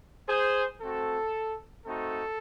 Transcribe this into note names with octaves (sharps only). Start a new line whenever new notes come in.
G#4 C5
A3 C4 F#4 A4
A3 C4 D#4 F#4 A4